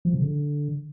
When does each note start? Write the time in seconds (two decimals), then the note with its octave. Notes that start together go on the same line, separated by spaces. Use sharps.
0.05 F3
0.13 C#3
0.22 D3